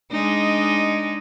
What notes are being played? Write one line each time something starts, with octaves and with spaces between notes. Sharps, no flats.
G#3 D4 D#4